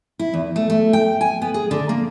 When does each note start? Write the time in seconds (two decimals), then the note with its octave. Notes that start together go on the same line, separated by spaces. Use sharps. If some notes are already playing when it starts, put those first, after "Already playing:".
0.19 E4
0.34 E2
0.56 A3
0.70 A3
0.93 G5
1.21 G#5
1.42 B3
1.54 G#4
1.71 D3
1.89 A#3